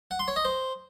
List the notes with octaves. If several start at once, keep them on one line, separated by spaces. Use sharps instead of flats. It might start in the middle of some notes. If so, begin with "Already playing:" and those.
F#5
C6
C#5
D#5
C5